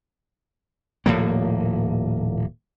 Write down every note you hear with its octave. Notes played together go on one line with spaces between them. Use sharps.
D#1 A2 F3 A#3